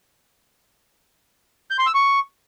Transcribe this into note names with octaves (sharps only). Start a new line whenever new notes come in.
G6
C6
E6
C#6